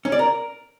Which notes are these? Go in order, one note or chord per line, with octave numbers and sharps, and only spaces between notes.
C#4
D5
A#4